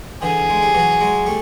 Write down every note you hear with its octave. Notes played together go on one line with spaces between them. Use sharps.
D3 E3 G#4
G#3
G3
E3 F#3
F#3 G#3
G3 A3